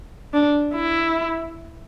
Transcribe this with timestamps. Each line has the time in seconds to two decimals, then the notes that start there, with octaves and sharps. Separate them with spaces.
0.33 D4
0.75 E4